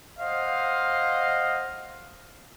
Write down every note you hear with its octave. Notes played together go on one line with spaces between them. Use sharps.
C5 D#5 F5 F#5